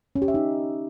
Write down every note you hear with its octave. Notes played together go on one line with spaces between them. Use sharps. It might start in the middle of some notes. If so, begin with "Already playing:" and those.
C#4
G4
E5
D#4